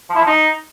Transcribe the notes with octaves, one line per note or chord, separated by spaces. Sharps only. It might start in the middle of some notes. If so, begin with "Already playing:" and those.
F3
E4
F3
D#4